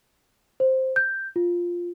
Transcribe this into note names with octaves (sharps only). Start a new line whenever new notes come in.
C5
G6
F4